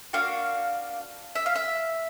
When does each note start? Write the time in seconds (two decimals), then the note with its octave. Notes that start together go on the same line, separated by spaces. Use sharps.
0.13 A#3 D4 F#4 F5
1.35 E5
1.46 F5
1.56 E5